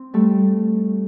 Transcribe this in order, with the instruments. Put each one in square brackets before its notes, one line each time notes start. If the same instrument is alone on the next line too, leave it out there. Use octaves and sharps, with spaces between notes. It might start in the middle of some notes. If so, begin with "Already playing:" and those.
Already playing: [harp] C4
G3 A3